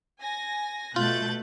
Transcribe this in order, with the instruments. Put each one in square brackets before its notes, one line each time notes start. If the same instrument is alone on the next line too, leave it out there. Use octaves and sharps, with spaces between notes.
[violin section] G#5 A#6
[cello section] B2 A3 [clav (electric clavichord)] F4 [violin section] F#6 G6 A6